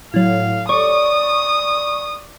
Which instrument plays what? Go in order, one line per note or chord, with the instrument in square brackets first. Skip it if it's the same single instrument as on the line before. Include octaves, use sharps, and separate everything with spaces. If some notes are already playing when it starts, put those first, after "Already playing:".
[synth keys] A2 F#3 [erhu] F5
[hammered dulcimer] D5 [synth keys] C#6 [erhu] D#6